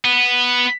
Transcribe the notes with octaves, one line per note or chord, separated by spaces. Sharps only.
B3